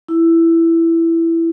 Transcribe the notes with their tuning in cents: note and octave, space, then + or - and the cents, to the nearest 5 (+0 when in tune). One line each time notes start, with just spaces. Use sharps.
E4 +10